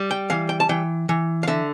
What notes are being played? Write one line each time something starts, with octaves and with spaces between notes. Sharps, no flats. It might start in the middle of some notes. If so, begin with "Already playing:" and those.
Already playing: G3
G5
E3 F5
G5
A5
E3 G5
E3
F5
D3 E5